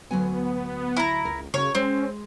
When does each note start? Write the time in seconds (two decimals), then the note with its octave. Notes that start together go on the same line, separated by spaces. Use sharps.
0.11 D2 F#3 B3 G#5
0.97 E4 A#5
1.25 C#2 A#4
1.54 C#3 C#4 F#4 A#4 C#5
1.75 G#3 C4 C#4